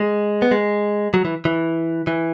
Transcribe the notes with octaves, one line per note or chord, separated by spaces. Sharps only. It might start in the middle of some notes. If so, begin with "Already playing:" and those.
Already playing: G#3
B3
G#3
F#3
E3
E3
E3